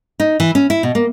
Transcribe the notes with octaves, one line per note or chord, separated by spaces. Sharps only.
D#4
E3
C#4
E4
B2
A#3